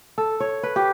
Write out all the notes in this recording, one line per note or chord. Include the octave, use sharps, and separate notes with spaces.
A4
C#5
B4
G4